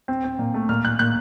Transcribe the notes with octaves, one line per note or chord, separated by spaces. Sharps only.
C4
C4
A#2
A3
A#2 F6
A#2 F#6
A#2 F#6